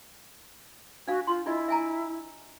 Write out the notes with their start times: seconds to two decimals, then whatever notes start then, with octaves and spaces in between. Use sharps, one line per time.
1.08 D4 F#4 F5
1.27 F4 C6
1.46 D4 E4 F4 D#5
1.68 E5 G#5 A#5